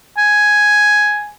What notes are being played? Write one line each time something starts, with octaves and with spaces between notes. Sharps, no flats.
G#5